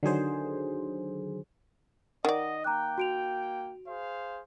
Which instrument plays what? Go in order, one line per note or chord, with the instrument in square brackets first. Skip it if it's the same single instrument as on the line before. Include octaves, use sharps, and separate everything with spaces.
[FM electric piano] D3 D#3 F#3 G#4 C5
[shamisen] D#3 D5 [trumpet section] D#5 [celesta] F#5
[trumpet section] A#3 G5 [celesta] A#5 D6 F#6
[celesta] F#4 D7 F7
[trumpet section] G#4 C5 F5